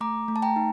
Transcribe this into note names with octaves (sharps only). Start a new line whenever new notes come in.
A3 A#5 D6
A3
A5
G5 A#5
D#4